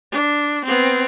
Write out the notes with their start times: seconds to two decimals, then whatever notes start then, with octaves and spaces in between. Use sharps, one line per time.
0.12 D4
0.65 B3 C4